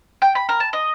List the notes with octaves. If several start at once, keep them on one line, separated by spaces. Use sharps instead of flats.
G5
B5
A#4
A5
D#5